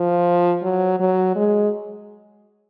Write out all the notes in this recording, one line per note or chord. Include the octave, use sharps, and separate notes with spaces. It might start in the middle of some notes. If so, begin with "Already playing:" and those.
Already playing: F3
F#3
F#3
G#3